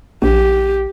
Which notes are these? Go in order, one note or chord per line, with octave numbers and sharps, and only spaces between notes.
A#1 G4